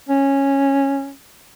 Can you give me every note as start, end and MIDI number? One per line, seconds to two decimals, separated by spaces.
0.09 1.12 61